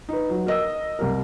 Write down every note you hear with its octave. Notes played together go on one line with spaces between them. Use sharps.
D#4 B4
F#3
A#4 D#5 E6
C2 G4 A#4